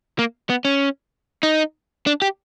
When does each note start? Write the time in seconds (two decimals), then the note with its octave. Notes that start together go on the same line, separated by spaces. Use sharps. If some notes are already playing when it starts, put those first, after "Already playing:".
0.19 A#3
0.50 B3
0.65 C#4
1.43 D#4
2.07 D4
2.22 G4